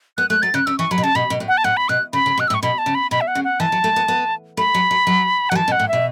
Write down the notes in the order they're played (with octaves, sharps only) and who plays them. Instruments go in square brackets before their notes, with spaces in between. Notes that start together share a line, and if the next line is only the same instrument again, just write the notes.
[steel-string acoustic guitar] B3 [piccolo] F#6
[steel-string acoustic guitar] A3 [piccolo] F#6
[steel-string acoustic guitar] F#3 [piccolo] A6
[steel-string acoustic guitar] C#3 [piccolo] F#6
[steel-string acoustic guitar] C#3 [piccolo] E6
[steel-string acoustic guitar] E3 [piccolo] C#6
[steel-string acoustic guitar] F#3 [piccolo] B5
[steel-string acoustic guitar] B2
[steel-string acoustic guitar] C#3 [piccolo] A5
[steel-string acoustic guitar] B2 [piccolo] B5
[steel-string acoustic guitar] B2
A2
[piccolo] F#5
A5
[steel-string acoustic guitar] A2 [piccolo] F#5
[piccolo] B5
[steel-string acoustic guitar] B2 [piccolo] F#6
[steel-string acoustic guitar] C#3 [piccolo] B5
[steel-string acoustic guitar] C#3
[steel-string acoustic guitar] B2 [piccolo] F#6
[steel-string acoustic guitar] A2 [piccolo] E6
[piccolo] C#6
[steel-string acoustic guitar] B2 [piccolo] B5
[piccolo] A5
[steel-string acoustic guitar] C#3
[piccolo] B5
[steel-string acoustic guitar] B2 [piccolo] B5
[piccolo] E5
F#5
[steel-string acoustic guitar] C#3
[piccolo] F#5
[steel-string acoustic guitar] E3 [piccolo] A5
[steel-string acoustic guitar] F#3
A3
B3
B3
[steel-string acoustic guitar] A3 [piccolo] B5
[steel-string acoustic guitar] F#3
F#3
F#3
[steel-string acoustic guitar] F#3 [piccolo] F#5
[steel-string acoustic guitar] E3 [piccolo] A5
[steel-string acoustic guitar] B2
[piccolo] F#5
[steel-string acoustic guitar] A2
[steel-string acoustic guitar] B2 [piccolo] E5